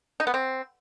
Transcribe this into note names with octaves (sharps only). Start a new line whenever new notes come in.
D#4
B3
C4